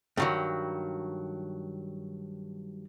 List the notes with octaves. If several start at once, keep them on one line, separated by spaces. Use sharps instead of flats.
G2 D#3 F#3